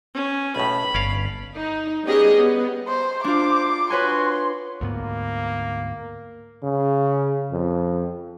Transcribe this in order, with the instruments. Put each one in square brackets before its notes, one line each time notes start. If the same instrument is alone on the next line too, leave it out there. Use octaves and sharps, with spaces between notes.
[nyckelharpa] C#4
[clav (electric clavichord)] B1 A2 [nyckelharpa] B5
[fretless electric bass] G1 [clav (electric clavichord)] C#4 D5 F5
[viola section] D#4
G3 B3 C#4 G4 G#4 D#5
B3
[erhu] C5
[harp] D4 F4 [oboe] C5 [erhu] D6
[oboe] F#4 [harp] B4 C#5 G#5 [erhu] C6
[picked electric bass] D2 G#2 B3 [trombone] A#3
[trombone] C#3
F2